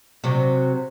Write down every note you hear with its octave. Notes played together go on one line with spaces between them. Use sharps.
C3 F#3